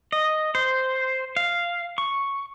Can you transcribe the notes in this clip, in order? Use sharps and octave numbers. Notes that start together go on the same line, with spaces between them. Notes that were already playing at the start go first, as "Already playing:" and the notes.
D#5
C5
F5
C#6